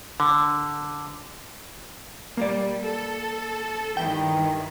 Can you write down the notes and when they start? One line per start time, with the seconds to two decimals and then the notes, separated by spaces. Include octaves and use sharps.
0.20 D3
2.37 G3 A#3 D5
2.84 A4
3.97 G2 D#3 E3 G5